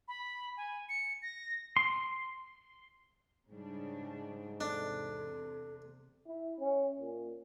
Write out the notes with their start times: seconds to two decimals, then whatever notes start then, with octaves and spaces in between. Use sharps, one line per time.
0.08 B5
0.57 G#5
0.89 C#7
1.22 A#6
1.77 C6
3.49 G#2 C#3 G3 D4
4.61 E2 C3 D4 A4
6.27 E4
6.60 C#4
7.00 A#2